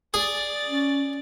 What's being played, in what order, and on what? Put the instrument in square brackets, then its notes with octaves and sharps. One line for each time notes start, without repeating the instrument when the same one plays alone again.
[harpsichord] G#4 [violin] D5 A6
[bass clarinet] C#4